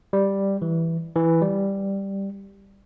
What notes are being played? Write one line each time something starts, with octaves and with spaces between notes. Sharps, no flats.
G3
E3
E3
G3